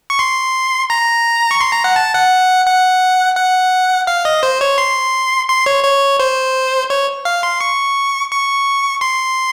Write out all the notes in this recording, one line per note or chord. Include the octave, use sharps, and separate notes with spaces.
C#6
C6
A#5
C#6
C6
A#5
F#5
A5
F#5
F#5
F#5
F5
D#5
C5
C#5
C6
C6
C#5
C#5
C5
C#5
F5
C6
C#6
C#6
C6